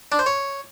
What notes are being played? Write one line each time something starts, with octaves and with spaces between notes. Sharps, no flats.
D4
C5
C#5